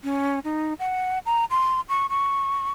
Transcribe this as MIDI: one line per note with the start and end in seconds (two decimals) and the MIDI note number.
0.04 0.40 61
0.44 0.74 63
0.80 1.19 78
1.26 1.45 82
1.50 1.81 84
1.89 2.06 85
2.10 2.72 85